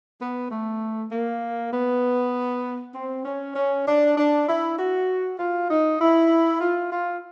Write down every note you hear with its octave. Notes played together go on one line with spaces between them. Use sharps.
B3
A3
A#3
B3
C4
C#4
C#4
D4
D4
E4
F#4
F4
D#4
E4
F4
F4